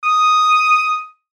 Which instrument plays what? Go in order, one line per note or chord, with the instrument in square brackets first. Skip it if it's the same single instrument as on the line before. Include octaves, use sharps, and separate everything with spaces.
[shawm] D#6